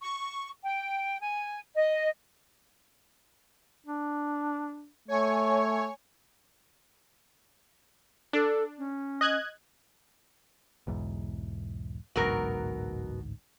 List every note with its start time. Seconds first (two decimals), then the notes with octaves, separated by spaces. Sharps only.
0.01 C#6
0.63 G5
1.20 G#5
1.76 D#5
3.86 D4
5.08 A3 C#5 G#5 C#6
8.33 D4 A4
8.78 C#4
9.21 D#5 F#6 G#6
10.87 B1 E2 G#2
12.16 A1 D2 G#2 B2 F#3 A#4